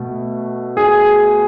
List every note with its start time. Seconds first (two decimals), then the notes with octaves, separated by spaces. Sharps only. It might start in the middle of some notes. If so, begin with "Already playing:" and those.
Already playing: B2 A3
0.77 G#4